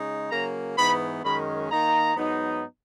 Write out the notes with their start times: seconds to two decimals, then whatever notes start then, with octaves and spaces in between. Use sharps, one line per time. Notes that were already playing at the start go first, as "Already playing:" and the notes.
Already playing: C#3 G#3 D#4
0.30 C#3 F#3 A#3 A#5
0.76 G#2 E3 B3 D#4 B5
1.23 F#2 D#3 G#3 C#4 B5
1.70 D#3 A#3 D#4 A#5
2.16 G#2 F#3 B3 D#4